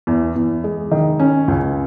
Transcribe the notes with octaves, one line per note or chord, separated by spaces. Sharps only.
E2
E2
G#3
D#3
C#4
C#2